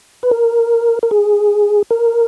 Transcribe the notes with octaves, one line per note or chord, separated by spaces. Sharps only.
B4
A#4
A#4
G#4
A#4